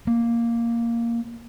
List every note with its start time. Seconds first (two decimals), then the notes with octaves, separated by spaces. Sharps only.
0.07 A#3